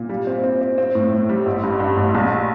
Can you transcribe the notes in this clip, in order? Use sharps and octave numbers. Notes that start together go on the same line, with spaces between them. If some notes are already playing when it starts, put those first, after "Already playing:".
Already playing: A#2
G3
C4
C4
C4
C4
A2
A2
G3
A1
G2
G2
A1
A#1